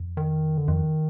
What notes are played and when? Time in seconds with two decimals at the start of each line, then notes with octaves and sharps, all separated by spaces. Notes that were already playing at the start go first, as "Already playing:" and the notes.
Already playing: F2
0.17 D#3
0.58 D3
0.68 F2 D#3